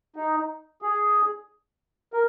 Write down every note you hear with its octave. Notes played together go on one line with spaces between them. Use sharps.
D#4
G#4
A#4